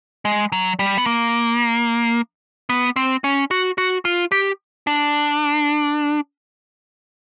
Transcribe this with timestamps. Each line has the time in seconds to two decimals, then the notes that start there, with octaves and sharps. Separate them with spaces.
0.25 G#3
0.52 F#3
0.79 G3
0.98 B3
1.06 A#3
2.70 B3
2.96 C4
3.24 C#4
3.51 F#4
3.78 F#4
4.05 F4
4.32 G4
4.87 D4